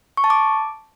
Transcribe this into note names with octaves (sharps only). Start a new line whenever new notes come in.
C#6
A5
D6